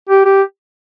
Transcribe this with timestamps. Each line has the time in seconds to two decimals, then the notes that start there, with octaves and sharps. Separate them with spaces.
0.09 G4
0.25 G4